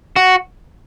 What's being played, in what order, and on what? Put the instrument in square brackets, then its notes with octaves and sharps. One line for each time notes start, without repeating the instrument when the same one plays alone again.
[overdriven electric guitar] F#4